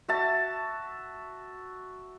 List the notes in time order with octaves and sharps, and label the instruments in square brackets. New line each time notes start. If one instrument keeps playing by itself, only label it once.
[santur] F#4 E5 A5